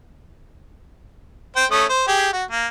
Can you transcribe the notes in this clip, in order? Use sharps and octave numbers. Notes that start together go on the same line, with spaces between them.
C5 G5
A3 C#4 D#6
C5
G4 G#4
F#4
A#3